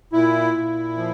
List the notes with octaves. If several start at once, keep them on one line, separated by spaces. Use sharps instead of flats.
A#2 E4
A#2
F3